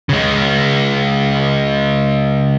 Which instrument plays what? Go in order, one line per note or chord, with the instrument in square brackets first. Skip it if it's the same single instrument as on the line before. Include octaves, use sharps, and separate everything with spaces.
[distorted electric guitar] C#3 G#3